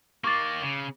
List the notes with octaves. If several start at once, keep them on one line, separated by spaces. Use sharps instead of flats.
D#3 A#3 C#6 D6 A6
C#3